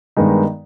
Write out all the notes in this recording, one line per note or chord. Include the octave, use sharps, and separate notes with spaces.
G2 D#3 G#3 B3 D#4